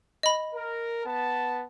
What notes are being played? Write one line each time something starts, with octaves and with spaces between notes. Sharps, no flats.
D#5 B5
A#4
B3 A5